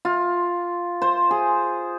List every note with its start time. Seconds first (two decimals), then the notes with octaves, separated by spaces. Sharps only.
0.05 F4
1.02 C5
1.31 G#4